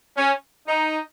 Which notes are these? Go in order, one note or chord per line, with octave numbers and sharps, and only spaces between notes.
C#4
D#4